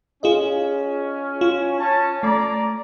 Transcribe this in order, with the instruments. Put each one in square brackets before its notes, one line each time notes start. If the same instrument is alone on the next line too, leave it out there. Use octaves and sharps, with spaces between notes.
[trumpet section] C#4 [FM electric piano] F4 G#4 D#5
[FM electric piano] F4
[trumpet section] C#4 A5
[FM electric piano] A3 [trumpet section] D5 A#5 D6